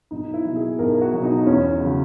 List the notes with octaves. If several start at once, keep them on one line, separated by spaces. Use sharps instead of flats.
B1 D#4
E4
B2 F#3
G#4
B1 A#4
F#4
B2 F#3
D#4
E2 C#4
C#3 F#3